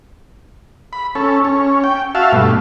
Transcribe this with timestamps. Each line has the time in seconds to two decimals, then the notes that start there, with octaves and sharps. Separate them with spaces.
0.93 B5
1.15 C#4 A4
1.45 C#4
1.84 G5
2.15 F#4 E5 F5 A5
2.32 G2 B2 A3